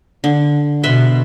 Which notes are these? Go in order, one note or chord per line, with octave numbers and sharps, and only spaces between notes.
D3
B2 B4 E5 C6